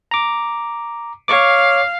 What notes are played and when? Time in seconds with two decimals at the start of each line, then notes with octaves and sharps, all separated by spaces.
0.11 A#5 D6
1.28 C#5 F5 C#6 D6